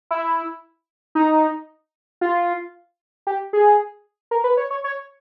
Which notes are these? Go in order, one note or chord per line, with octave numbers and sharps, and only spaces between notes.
E4
D#4
F4
G4
G#4
A#4
B4
C#5
C#5
C#5